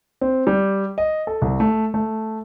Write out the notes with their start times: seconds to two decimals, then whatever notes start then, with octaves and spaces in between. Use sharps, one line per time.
0.21 C4
0.47 G3
0.98 D#5
1.27 A4
1.42 C2
1.60 A3
1.94 A3